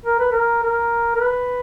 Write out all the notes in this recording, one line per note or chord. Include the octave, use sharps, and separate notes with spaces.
A#4
B4
A#4
A#4
A#4
B4